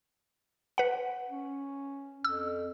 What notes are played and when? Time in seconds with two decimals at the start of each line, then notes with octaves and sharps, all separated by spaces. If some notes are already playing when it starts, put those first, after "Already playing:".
0.78 B4 F#5
1.30 C#4
2.25 F2 E6